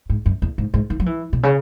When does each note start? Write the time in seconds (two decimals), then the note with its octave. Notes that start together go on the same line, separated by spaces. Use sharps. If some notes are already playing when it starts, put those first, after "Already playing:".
0.10 G#2
0.26 F#2
0.42 E2
0.58 G#2
0.74 G#2
0.90 D#3
1.00 F#3
1.06 E3
1.33 B2
1.43 C#3